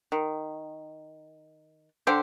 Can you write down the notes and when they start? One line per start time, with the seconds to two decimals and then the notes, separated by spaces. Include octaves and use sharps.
0.12 D#3
2.07 D3 G4 C5